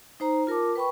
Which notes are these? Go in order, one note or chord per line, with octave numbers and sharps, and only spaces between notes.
D#4 C5 A#5
F4 A#4 A5 D6
B4 G5 B5 C#6